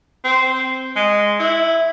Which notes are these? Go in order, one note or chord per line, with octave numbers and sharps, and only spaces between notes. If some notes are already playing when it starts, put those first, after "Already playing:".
C4
G#3
E4